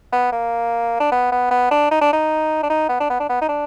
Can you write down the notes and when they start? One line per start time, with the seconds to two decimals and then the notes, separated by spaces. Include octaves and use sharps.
0.13 B3
0.32 A#3
1.00 D4
1.12 B3
1.32 B3
1.51 B3
1.71 D4
1.91 D#4
2.01 D4
2.13 D#4
2.63 D4
2.70 D#4
2.89 B3
3.01 D4
3.10 B3
3.20 D4
3.29 B3
3.42 D#4
3.49 D4